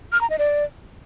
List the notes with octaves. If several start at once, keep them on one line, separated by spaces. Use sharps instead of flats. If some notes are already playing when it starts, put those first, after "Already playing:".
F6
A#5
D#5
D5